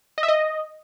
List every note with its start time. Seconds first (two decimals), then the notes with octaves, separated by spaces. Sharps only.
0.18 D#5
0.23 E5
0.28 D#5